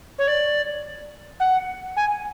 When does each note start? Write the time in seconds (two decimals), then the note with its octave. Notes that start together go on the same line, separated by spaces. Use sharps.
0.18 C#5
0.27 D5
1.39 F#5
1.96 G#5